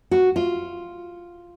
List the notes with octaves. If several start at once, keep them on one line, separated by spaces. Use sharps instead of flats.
F#4
F4